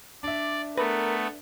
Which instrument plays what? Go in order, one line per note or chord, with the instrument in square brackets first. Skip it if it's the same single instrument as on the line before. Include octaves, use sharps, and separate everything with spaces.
[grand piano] D4 E5 [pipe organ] D5
[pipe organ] A3 B3 [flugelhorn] A#4 [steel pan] B4